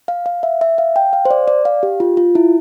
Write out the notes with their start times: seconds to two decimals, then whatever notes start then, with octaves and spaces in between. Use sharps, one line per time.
0.08 F5
0.26 F5
0.43 E5
0.61 E5
0.78 F5
0.96 G5
1.13 F5
1.25 C5
1.31 D5
1.48 D5
1.65 F5
1.83 G4
2.00 F4
2.17 F4
2.35 E4